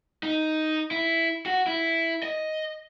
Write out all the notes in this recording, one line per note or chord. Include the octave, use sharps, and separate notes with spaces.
D#4
E4
F#4
E4
D#5